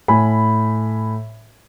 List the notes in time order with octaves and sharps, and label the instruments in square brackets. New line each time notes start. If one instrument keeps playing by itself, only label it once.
[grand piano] A2 G#5 B5